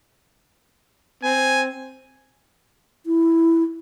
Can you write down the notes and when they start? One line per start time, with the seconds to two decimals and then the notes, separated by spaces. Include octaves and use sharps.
1.24 C4 G#5
3.06 E4